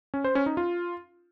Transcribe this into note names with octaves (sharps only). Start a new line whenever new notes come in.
C#4
C5
C#4
D#4
F4